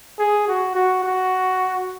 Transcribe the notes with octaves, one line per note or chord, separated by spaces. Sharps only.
G#4
F#4
F#4
F#4